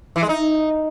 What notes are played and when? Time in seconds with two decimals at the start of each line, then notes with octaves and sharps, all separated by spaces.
0.16 E3
0.22 G#3
0.29 D#4